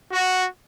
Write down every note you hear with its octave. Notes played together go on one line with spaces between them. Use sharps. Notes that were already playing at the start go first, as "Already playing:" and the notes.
F#4